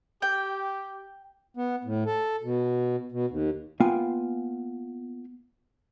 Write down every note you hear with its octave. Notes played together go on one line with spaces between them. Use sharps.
G4 G5
B3
A2
A4
B2
B2
D#2
A#3 B3 F4 G5 G#5